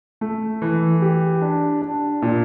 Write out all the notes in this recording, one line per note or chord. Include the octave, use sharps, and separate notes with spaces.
A3
E3
G4
D4
D4
A#2